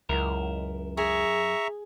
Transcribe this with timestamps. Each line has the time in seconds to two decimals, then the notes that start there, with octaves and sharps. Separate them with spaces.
0.09 C#2 F#2 E4 A#4
0.97 G#4 E5 A#5 C#6